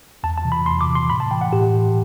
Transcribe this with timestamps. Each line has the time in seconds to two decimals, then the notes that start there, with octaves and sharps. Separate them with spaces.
0.23 E2 A5
0.38 A5
0.45 C3 E3
0.52 B5
0.66 E2 C6
0.81 D6
0.88 C3 E3
0.95 C6
1.10 A2 B5
1.20 A5
1.31 E3 G5
1.41 F#5
1.53 A2 G4
1.74 E3